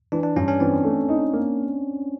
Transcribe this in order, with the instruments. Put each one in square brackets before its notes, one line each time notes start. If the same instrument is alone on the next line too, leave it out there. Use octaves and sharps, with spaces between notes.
[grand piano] E3 [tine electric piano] D4
[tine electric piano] D4
[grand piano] G2 [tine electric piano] C#4
[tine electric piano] C#4
[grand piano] E3 [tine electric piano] C4
[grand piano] A3
D#4
A#3